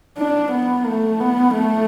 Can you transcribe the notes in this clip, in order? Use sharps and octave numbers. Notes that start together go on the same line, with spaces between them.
D4
B3
A3
B3
A3